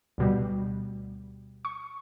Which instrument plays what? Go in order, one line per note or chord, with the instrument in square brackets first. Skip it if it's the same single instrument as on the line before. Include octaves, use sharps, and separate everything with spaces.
[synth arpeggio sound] D2 B2 G3
C#6